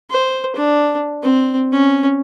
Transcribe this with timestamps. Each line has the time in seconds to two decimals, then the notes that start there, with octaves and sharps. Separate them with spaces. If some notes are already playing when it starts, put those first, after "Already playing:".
0.11 C5
0.56 D4
1.23 C4
1.72 C#4